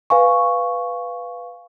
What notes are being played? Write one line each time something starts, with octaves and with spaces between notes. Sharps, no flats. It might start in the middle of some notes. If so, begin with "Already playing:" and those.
B4 F5 G#5 C#6